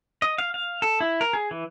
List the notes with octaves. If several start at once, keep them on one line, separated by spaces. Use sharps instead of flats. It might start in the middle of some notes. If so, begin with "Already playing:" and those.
D#5
F5
F5
A4
E4
A#4
G#4
E3